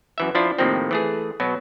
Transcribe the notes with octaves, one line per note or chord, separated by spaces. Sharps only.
F#2 E3 E5
F3 D4 E4 F4
A2 C3 D#3 F3 A#3 C4
E3 A3 G#4
B2 F#3